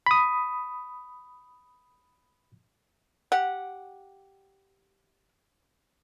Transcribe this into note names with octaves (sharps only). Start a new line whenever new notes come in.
B5 D#6
G4 F#5